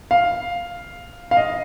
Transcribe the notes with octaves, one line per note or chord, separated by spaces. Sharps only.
F5
F5
D#5